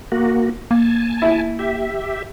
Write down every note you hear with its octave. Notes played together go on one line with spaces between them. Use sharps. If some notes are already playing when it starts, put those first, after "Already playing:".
A#3 F#4
A#3 G#5 A5
E4
G4 E5